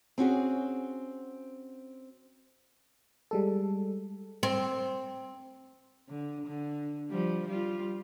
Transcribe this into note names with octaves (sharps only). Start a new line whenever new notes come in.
C4 C#4 F#4 G#4
G3 G#3 A4
C4
D3
D3
F3 G3
G3 F4